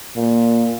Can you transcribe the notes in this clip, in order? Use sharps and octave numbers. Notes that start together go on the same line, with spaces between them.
A#2